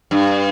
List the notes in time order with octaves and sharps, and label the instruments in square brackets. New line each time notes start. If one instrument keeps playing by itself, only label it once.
[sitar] G2